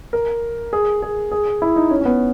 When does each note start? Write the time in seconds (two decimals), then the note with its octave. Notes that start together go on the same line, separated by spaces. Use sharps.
0.13 A#4
0.73 G#4
1.02 G#4
1.31 G#4
1.62 E4
1.76 D#4
1.91 C#4
2.01 C#4
2.05 B3